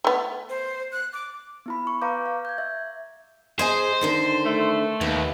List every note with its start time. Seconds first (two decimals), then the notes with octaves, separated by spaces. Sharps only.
0.04 A3 B3
0.49 C5
0.92 F#6
1.13 D6
1.66 B3 E4 B5
1.87 C#6
2.01 B4 F5 A#5 C#6 D6 G6
2.26 F5
2.45 G6 G#6
2.58 E5
3.59 G#4 C5 D#5 G#5
4.01 D3 D#3 A4
4.45 A3
5.01 D#2 B3